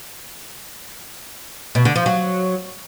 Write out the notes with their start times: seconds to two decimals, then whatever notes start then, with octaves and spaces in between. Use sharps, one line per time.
1.75 B2
1.85 D3
1.96 F3
2.06 F#3